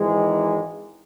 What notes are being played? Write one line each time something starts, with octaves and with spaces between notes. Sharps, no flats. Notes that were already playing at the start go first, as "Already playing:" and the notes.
Already playing: G#1 G#2 E3 G#3